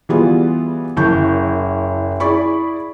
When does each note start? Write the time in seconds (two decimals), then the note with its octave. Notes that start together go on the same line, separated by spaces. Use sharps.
0.09 E3 G3 B3 F4 G#4
0.97 F#1 F#2 E4 A5 C#6 G6
2.20 E4 G#4 D5 B5 C#6